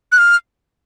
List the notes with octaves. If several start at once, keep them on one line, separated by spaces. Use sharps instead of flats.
F#6
F6